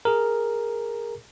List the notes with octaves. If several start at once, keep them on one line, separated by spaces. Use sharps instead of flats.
G#4 A#4